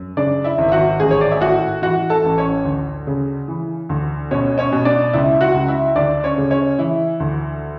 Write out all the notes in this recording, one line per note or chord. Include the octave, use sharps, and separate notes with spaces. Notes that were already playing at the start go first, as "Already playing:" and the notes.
Already playing: F#2
C#3 D4 D5
E4 E5
G#1
E5
F#4 F#5
A1 G#4 G#5
C#5
D5
E5
A2 F#4 F#5
E3 F#4 F#5
A4 A5
A1
C#4 C#5
D2
C#3
E3
D2
B2 C#4 C#5
C#4 C#5
B2
D4 D5
C#2 E4 E5
F#4 F#5
C#2
E4 E5
D2 D4 D5
C#4 C#5
C#3
C#4 C#5
E3 E4
D2